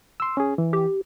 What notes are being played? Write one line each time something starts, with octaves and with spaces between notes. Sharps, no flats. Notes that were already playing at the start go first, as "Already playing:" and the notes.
C6 E6
C#4 G#4
E3
G4